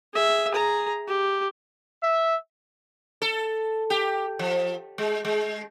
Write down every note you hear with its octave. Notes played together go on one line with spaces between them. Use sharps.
G#4 E5
G#4 A#5
G4
E5
A4
G4
F3
G#3
G#3